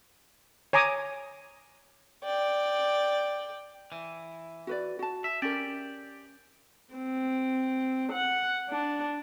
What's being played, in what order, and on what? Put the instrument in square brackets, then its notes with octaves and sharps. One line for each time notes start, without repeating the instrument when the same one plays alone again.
[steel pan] C#5 G#5 A#5 D6 D#6
[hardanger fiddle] D5 G5
[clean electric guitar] E3
[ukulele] F#4 B4 D5
F#4 A5
[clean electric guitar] E5
[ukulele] C#4 A#4 [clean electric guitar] G4 D5
[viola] C4
F#5
D4